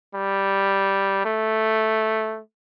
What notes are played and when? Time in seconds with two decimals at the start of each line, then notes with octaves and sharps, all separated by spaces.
0.14 G3
1.25 A3